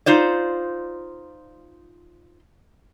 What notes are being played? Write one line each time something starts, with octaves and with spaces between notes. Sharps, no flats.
D#4 F4 C5 D5